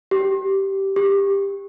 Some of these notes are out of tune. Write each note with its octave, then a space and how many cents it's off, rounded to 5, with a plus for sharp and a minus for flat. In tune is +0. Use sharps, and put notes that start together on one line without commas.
G4 -15
G4 +15